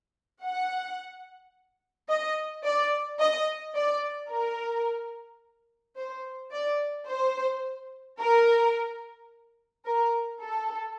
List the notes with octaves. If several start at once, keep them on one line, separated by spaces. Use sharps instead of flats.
F#5
D#5
D5
D#5
D5
A#4
C5
D5
C5
A#4
A#4
A4